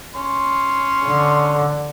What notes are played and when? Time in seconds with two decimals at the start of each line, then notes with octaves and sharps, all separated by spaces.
0.15 C#4 C6
1.06 D3